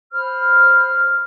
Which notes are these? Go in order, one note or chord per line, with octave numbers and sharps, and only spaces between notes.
C5 B5 F6